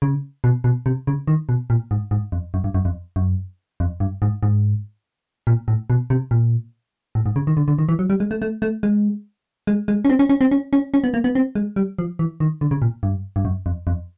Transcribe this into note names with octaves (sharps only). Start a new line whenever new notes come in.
C#3
B2
B2
C3
C#3
D#3
B2
A#2
G#2
G#2
F2
F#2
G2
F#2
F2
F#2
F2
G2
G#2
G#2
A#2
A2
B2
C3
A#2
A2
G#2
C#3
D#3
D3
D3
D#3
E3
F#3
G3
G#3
A3
A3
A3
G#3
G#3
G#3
C#4
C4
C#4
C#4
C4
C#4
C#4
C#4
B3
A#3
B3
C4
G#3
G3
F3
E3
D#3
D3
C#3
A#2
G2
G2
F#2
F2
F2